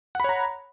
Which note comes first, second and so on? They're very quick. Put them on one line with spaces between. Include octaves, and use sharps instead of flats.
F#5 B5 C#5 A#5